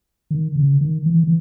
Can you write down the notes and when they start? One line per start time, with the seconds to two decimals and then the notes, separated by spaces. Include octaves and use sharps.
0.31 D#3
0.56 C#3
0.81 D#3
1.06 E3
1.24 E3